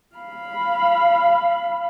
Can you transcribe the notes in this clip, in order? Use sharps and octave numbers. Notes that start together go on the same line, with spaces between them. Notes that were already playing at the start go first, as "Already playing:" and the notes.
F5 B5